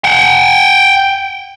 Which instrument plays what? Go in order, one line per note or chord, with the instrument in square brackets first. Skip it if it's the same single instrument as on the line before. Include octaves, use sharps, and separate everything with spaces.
[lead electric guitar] F#5 G5